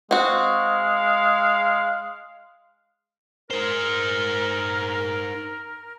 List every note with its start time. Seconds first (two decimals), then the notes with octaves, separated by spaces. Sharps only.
0.11 G#3 C4 F#4 F5
3.50 D#4 A#4 C5